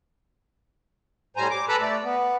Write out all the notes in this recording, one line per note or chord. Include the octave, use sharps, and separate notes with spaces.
A2 G3 C5 G#5 A#5
D6
A4 B4 A#5 B5 E6 F#6
A3 D5
B3